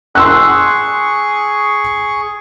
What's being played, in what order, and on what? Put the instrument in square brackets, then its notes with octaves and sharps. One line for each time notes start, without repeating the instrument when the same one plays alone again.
[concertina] G#4 C#6 [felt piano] C6 E6 F#6